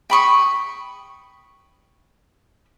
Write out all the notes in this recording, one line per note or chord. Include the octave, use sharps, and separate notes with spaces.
G5 B5 C#6 D#6